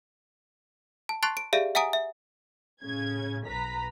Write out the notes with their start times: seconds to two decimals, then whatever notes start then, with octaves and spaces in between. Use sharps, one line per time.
1.09 A5
1.23 A5 C6 C#6 F#6 A6 C7
1.37 D7
1.53 G4 G#4 D5 E5 F5
1.75 E5 F#5 G#5 A#5 D#6 D7
1.93 E5
2.83 A2 C#3 C#4 G#6
3.46 B1 B4 A#5 B5 B6